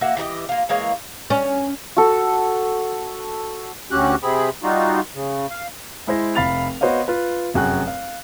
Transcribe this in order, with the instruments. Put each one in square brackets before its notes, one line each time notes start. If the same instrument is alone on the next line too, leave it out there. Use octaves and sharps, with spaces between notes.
[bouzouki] A#3 F#4 E5
E3 G4 A#4 D#5
A#3 F4
E3 G#3 A#3 C#5
[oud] C#4
[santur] F#4 A4
[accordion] D2 C#4 F#4 G4 F#6
C3 C4 G#4 B5
G3 D#4 F4 F#4
C#3
F5
[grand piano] G#3 E4 C5 A#6
F1 F5 B5 A6 F7
B3 F#4 C5 C#5 D#5 F5
F4 B4
F1 F#2 F#4 G#4 G5 F#6
F5